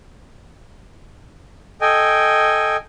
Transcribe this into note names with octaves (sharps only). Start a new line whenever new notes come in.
A4 D#5 G5 G#5